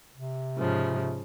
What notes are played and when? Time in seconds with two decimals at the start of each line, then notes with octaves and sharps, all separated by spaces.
0.15 C3
0.56 G#2 C#3 F3